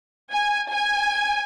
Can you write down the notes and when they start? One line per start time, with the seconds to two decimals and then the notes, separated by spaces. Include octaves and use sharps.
0.32 G#5
0.71 G#5